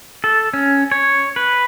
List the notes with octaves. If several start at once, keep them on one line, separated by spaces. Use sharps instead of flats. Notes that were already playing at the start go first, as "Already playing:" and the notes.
A4
C#4
C#5
B4